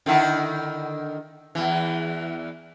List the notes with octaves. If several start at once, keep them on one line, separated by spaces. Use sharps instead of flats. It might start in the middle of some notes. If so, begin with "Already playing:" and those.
D3 D#3 E4
E2 E3